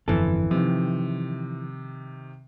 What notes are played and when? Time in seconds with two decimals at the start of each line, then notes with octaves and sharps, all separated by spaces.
0.08 G1 F2 E3 A4
0.51 C3 D#3 F3